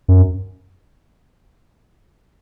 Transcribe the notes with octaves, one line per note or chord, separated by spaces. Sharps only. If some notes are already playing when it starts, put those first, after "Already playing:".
F#2